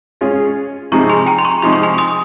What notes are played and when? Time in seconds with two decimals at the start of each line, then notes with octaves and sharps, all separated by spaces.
0.21 G#3 C#4 F4 G#4 C#5
0.92 C3 F3 G#3 D#4 G#4 A#5 C#6
1.10 G#5 C6
1.27 G5 A#5
1.39 C6
1.45 A#5 C#6
1.62 C3 F3 G#3 D#4 G#4 C6
1.73 C#6
1.83 G#5 C6
1.98 C6 D#6